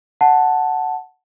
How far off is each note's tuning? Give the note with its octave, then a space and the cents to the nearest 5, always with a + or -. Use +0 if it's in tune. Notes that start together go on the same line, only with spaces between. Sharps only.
F#5 +0 A5 +0